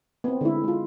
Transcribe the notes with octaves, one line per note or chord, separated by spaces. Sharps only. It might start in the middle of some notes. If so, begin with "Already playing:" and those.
B3 C4
D3 G#3 E4
G#3 F4